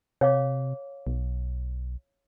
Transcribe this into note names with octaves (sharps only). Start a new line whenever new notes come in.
C3 C#5 F5 D6
B1